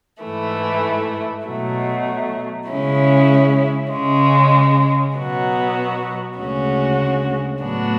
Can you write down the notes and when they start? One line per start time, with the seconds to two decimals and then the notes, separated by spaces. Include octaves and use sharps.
0.24 G#2 E3 A3 E4
1.47 B2 F#3 A3
2.70 C#3 G#3 C#4 E4
3.93 C#3 G#3 C#4
5.16 B2 F#3 B3 F#4
6.39 D2 C#3 G#3 C#4 F#4
7.63 A2 F#3 B3 D4 F#4